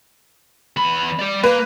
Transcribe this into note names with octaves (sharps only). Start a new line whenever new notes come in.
E2 B5
G4 D5
A#3 B4